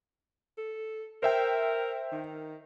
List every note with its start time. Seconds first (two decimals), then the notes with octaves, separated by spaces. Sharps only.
0.57 A4
1.23 A#4 C5 E5 G5
2.12 D#3